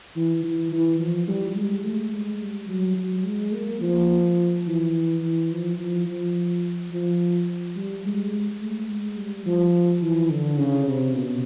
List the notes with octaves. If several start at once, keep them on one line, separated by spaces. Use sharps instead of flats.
E3
E3
E3
F3
G3
G#3
A3
G#3
G3
F#3
F#3
G#3
A#3
F3
E3
E3
F3
F3
F3
F3
G3
G#3
G#3
A3
G#3
G3
F3
E3
D3
C#3
C3
B2